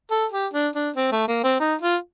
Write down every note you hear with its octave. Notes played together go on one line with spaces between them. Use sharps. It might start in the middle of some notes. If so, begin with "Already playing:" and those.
A4
G4
D4
D4
C4
A3
A#3
C4
D#4
F4